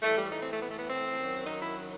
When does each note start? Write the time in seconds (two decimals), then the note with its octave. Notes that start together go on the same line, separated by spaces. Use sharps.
0.02 A2 E3 G3 A3
0.17 G3
0.32 D#4
0.41 C4
0.51 A3
0.60 B3
0.70 A3
0.79 B3
0.89 C4
1.18 F#2 D#3 F#3
1.46 D#4
1.62 E4